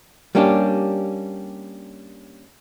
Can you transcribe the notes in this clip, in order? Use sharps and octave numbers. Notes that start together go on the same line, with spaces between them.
G3 A#3 C#4 D4 G4